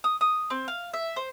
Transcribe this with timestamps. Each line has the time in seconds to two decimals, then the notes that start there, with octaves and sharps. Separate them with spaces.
0.04 D#6
0.21 D#6
0.50 C4
0.68 F5
0.94 E5
1.16 C5